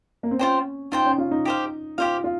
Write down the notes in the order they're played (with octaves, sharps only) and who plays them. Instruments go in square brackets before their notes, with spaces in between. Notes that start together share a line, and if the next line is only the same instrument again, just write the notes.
[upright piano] A#3
C4
[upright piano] C#4 [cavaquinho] F4 C5 G5
[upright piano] D#4 [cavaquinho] F4 C5 G5
[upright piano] C#4
F4
D#4
[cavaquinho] G4 C5 F5
[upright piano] F4 [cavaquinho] G4 C5 F5
[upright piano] F4